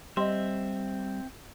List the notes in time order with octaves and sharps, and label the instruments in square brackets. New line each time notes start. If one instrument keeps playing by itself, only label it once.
[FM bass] G3 [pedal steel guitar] C4 E5 [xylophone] D#5 C6